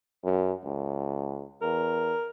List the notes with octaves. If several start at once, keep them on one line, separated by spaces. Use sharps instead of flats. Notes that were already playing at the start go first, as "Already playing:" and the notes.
F#2
C#2
E2 A#4